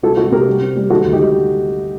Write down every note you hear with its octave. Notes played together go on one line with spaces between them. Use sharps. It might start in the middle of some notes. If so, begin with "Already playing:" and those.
C2 F#4 A4
C2 F#4 A4
C3 G4 A#4
G3
C4
G3
D#3 F#4 A4
D2
D#4 G4